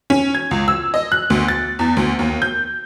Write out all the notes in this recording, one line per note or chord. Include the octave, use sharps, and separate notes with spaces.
C#4
G#6
C#2
E6
D#5
F#6
D2
A6
E2
D2
D#2
G6